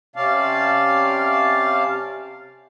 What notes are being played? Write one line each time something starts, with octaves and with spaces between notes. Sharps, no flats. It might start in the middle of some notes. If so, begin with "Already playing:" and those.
C3 C#4 D5 F5 A5